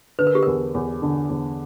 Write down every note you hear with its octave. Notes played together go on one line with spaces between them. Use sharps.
D3 B4
A#4
G4
E2 A#4
E2
D3
E2